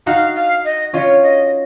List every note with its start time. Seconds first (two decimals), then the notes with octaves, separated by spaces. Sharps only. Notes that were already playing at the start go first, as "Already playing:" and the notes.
0.06 D#4 F#4 F5
0.35 F5
0.65 D#5
0.93 C#4 F4 C#5 D#5
1.23 D#5